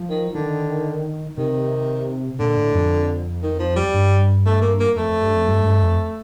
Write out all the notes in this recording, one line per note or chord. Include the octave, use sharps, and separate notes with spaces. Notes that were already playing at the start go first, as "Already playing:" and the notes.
Already playing: F3
D#3
D3 D#3
C3 D#3
A#2 D3
A2
F2
D#3
F3
G3
G2
A3
A#3
A#3
F2 A3
F2
G2
F2
G2
G2
F2